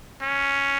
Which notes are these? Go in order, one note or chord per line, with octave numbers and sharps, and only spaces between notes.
C#4